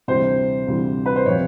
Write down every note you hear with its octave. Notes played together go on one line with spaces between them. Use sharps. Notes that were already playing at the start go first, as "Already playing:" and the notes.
D2 C3 E3 G3 C5
D2 C3 E3 G3
B4
C5
C3 F3 C#5